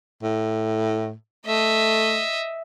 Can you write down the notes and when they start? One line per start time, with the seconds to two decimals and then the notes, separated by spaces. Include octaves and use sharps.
0.22 A2
1.46 A3 D#5 E5